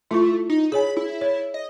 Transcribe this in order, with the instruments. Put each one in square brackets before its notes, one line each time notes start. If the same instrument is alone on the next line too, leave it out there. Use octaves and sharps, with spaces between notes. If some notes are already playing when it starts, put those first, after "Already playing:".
[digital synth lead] A3 [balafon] E4 F4 C#6
[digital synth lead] D#4
[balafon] G#4 C#5 G#5 [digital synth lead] B5
[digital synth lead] E4
[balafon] C#5
[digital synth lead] D#5